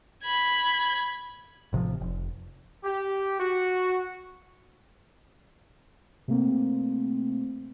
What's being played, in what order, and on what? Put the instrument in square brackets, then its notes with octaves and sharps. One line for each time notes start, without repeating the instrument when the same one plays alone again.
[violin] B5 G#6
[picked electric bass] A1 C3 E3 F3
F1
[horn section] G4
F#4
[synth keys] C3 A3 A#3 C4